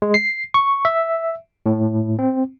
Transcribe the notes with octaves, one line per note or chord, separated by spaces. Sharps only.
G#3
C7
C#6
E5
A2
C4